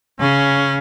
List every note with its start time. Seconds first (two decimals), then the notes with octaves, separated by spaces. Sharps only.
0.20 C#3 C#4